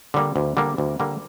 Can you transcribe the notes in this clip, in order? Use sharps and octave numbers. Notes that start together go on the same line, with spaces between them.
D3 G3 A#3
D2
D3 G3 A#3
D2
D3 G3 A#3